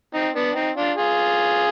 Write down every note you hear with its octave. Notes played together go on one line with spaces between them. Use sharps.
C4 D#4
B3 D4
C4 D#4
D4 F4
F4 G#4